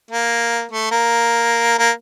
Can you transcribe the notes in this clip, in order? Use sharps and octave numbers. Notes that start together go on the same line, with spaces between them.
A#3
A3
A#3
A#3